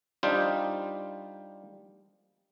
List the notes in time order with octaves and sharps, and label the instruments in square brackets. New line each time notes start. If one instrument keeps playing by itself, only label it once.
[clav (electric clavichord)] G3 D4 D#4 F4 C5